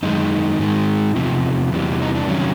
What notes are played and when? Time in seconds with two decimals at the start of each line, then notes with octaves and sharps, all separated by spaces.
0.03 F#2 D#3 G#3 D#4
0.59 G#2 D#3 G#3
1.16 E2 C3 F3
1.72 E2 C3 E3 G3
2.02 D#4
2.15 D4
2.28 F2 C3 D#3 F#3 C#4